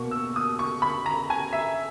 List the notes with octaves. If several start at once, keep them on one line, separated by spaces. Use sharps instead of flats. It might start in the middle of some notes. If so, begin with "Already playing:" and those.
Already playing: B2 A#3 C#6
E6
D#6
C#6
B5
A#5
G#5
E5